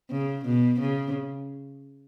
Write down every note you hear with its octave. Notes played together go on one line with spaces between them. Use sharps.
C#3
B2
C#3